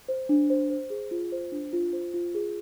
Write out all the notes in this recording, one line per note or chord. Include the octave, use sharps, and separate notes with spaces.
C5
D4
C5
C5
G#4
F4
C5
D4
F4
C5
F4
G#4